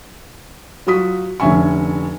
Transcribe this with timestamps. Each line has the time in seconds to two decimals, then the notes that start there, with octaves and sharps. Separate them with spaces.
0.87 F#3 F4 F#4 D#6 B6
1.40 F1 D3 C#4 E5 G#5 C#6